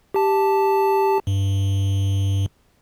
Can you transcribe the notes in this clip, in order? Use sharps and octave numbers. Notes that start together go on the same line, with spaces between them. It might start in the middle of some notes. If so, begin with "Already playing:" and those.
G4 A5
G2